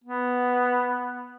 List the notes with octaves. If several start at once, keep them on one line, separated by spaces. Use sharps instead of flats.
B3